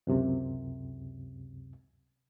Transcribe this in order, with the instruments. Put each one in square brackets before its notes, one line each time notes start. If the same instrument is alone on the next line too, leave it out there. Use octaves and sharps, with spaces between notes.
[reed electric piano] C#2 F#2 C3